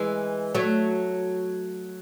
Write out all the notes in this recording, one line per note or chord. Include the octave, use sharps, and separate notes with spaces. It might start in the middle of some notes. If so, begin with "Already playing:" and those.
Already playing: E3 G#3
F#3 A3